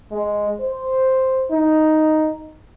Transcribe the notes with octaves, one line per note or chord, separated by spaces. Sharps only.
G#3
C5
D#4